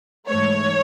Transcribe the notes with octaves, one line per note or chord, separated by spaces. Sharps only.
G#2 E3 A3 C#5